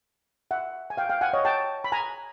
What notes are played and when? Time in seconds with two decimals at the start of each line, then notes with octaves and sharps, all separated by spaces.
0.51 E5 F#5
0.90 G#5
0.97 F5 G5
1.10 F5 G5
1.21 F#5 G#5
1.33 C#5 D#5
1.45 G5 A5
1.84 B5
1.92 G#5 A#5